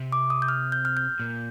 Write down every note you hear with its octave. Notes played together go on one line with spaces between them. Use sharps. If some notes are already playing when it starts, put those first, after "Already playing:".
Already playing: C3
D6
D#6
G6
F6
G6
F6
G6
A#2